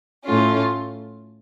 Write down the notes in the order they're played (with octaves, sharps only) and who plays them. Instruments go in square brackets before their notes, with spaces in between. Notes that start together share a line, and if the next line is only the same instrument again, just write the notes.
[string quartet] A2 A3 C#4 F4